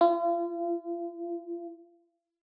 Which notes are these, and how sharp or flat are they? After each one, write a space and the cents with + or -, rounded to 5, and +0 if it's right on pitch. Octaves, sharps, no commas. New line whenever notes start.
F4 -40